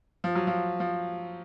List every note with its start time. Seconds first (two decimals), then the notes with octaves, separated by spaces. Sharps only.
0.24 F3
0.35 F#3
0.47 F3
0.80 F3